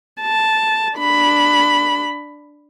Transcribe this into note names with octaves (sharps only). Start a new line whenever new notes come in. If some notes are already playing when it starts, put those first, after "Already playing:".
A5
D4 B5